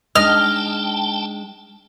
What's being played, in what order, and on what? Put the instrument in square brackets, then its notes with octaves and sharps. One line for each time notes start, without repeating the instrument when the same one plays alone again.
[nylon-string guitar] G#3 D4 D#4 [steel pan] D#5 [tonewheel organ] G5 A5 [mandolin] F6